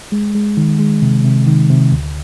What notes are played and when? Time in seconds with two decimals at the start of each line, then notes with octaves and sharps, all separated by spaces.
0.12 G#3
0.35 G#3
0.57 D#3
0.79 G#3
1.02 C3
1.24 C3
1.47 D#3
1.70 C3
1.92 D2